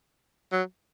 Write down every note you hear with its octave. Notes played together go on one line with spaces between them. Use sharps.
F#3